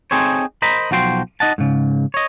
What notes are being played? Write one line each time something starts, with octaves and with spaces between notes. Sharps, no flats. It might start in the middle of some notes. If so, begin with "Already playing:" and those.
C4 D#4 G#4 A4 C5 C#5
A#4 C5 D#5 A#5 B5
B1 F3 F#4 G5 C6
D#4 D#5 F#5 A5
G#2 C#3
C#5 D#5